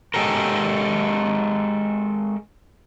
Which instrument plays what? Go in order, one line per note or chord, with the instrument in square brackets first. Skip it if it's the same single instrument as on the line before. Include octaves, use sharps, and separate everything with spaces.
[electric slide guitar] G#3 G4 A4 A#4